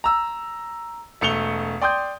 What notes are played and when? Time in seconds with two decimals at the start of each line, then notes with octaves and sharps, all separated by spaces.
0.04 A#5 E6
1.21 E1 A3 C#7 F7 G7
1.82 D5 G5 C6 D#6 G6